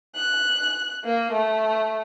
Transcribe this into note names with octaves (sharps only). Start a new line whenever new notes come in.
F#6
A#3
A3